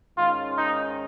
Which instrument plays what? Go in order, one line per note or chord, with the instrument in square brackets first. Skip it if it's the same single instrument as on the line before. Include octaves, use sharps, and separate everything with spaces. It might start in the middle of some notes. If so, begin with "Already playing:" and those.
[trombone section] G#2 D#3 G#3 C#4 [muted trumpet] F4
[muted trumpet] D#4